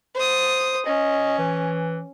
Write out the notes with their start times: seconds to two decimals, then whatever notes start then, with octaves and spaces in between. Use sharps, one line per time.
0.15 C5 D#6
0.86 C#4 D#5
1.38 E3